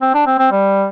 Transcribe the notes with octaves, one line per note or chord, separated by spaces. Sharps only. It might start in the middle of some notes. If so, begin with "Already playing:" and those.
C4
D4
C4
C4
G3